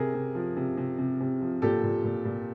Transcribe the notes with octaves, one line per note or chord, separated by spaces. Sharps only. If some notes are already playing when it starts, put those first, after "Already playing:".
Already playing: C3 G#4 A#4
C3
F3
C3
C3
C3
C3
F3
A#2 G4 A4
A#2
A#2
A#2